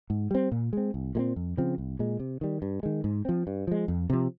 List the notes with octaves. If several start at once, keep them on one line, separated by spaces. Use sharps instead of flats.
G#2
G3 C4
A#2
G#3 C4
C2
A#2 G#3 C4
F2
C#3 F3 C4
C2
A#2 G#3
C3
D#3 G3
G2
D#3 G#3
G#2
F3 C4
G2
F3 G#3
F2
C3 F3